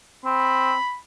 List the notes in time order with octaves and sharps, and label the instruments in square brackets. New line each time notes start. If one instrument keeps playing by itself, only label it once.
[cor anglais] C4 [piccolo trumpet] B5